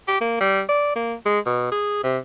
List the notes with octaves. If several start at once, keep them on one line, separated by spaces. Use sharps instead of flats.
G4
A#3
G3
D5
A#3
G#3
B2
G#4
C3